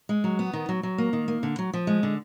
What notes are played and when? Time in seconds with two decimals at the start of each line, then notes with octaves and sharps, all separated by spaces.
0.09 G#3
0.24 F#3
0.39 B3
0.53 D#3
0.69 F#3
0.83 F#3
0.98 A#3
1.13 D#3
1.28 A#3
1.43 D3
1.59 F#3
1.73 F3
1.87 G#3
2.03 D3